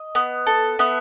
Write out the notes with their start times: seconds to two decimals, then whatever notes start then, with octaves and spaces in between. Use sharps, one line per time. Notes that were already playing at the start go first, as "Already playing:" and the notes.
Already playing: D#5
0.15 B3
0.47 A4
0.79 B3 E5